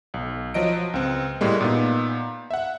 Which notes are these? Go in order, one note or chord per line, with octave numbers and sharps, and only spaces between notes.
B1
F3 F#3 D#5 D7
C#2 C4
A2 G3 G#3 A#3
A#2 B3 D#4
E5 F#5